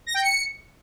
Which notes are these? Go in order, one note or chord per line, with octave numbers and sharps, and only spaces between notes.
A#6
G5
C#7